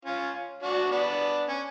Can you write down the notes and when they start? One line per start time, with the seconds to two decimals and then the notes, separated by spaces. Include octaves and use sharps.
0.05 C#4 F4
0.62 D4 F#4
0.91 B3 D4
1.48 C#4